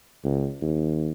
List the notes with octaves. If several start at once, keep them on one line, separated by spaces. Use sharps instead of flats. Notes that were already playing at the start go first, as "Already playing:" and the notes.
C#2
D#2